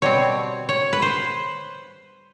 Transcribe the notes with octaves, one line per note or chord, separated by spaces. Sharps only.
B2 G3 C4 C#5
C#5
B4
C5